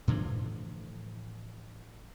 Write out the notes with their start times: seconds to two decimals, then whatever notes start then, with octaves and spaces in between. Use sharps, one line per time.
0.08 A2 D3 E3 F3